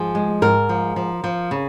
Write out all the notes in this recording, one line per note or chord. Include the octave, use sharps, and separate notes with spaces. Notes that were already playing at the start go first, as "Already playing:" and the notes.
Already playing: G#2 F3 G#4
G#3
G#2 A#4
F3
F3
F3
C#3